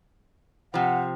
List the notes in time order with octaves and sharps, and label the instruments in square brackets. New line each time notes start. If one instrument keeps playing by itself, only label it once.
[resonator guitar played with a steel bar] C3 F3 [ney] F#5